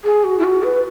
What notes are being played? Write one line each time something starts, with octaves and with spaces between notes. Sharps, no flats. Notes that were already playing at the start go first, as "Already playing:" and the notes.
G#4
F#4
E4
F#4
B4